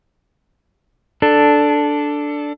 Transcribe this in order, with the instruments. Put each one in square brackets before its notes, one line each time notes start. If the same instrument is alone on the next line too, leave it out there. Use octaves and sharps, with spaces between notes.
[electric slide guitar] D4 A4